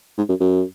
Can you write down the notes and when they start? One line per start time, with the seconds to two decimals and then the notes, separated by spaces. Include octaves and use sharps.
0.17 G#2
0.29 F#2
0.40 F#2